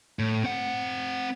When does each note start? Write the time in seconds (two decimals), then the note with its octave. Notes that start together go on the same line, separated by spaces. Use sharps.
0.19 A2
0.44 C4 F#5